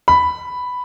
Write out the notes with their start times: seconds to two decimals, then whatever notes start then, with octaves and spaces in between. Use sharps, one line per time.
0.08 B5